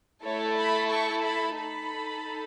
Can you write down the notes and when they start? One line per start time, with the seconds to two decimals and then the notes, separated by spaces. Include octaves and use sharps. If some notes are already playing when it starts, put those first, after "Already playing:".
0.23 A3 E4 A4 C#5
0.57 B5
0.90 C#6
1.24 B5
1.57 D#4 A4 B5